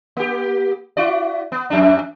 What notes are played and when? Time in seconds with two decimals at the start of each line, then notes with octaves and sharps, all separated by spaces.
0.17 A#3 G4
0.97 E4 F#4 D5
1.52 B3
1.70 F2 D4